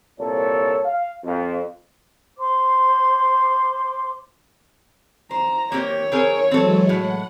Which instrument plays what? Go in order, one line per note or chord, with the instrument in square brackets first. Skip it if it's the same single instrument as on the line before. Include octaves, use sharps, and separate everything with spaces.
[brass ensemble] C2 A#2 A4 C#5
F5
F2
[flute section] C5 C6 D6
[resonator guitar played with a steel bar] C5 [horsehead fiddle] A#5
[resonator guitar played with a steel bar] A#3 C4 G4 [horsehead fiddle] C#5
[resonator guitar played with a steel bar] C4 G#4 A#4
[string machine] E3 F#3 G#3 [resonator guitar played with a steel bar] C4 A4
[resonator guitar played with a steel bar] A2 [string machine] F#5